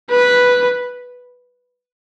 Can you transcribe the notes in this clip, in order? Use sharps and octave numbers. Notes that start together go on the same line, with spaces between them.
B4